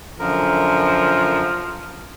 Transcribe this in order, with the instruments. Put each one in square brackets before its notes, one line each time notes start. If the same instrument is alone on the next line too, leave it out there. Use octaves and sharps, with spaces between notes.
[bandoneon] F#2 D3 A#4 [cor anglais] F3